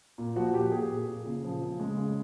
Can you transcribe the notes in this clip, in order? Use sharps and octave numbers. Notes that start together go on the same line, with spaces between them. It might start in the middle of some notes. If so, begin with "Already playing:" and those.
A#2
F3 F#4
A#2 G4
A#2 G#4
A#2
A#2
C#3
F3
C#3
G#3
C#3